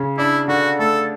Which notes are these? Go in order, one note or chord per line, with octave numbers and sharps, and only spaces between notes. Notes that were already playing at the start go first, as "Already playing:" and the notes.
Already playing: C#3
D4 E4
D3 F#4
A3 A4